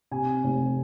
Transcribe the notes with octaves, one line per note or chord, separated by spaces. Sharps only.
C3 G#5
F1